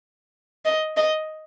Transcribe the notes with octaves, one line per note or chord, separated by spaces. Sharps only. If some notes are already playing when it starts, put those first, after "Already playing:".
D#5
D#5